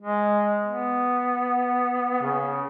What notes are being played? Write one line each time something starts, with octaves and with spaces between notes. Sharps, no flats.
G#3
B3
C#3